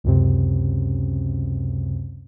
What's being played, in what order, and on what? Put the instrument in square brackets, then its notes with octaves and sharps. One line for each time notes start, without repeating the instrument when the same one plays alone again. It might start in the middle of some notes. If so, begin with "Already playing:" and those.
[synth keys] C#2 F#2 C3